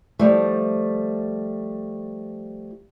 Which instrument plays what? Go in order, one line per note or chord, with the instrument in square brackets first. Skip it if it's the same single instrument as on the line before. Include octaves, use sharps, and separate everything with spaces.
[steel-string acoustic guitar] F3 G3 A3